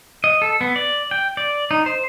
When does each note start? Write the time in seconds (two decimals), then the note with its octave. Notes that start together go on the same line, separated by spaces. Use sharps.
0.24 D#5
0.42 A4
0.61 B3
0.76 D5
1.11 G5
1.37 D5
1.71 D#4
1.86 C5